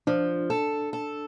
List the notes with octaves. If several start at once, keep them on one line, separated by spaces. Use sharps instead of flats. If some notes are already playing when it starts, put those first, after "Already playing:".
F3 D4
A4
A4